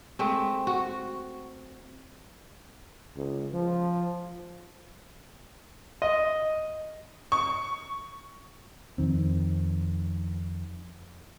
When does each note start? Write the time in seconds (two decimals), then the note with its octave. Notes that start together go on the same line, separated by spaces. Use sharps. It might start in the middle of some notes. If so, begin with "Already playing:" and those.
0.19 G#3 A3 C4
0.67 F#4
3.17 C#2
3.53 F3
6.02 D#5
7.32 C#6
8.98 F2 D#3 C4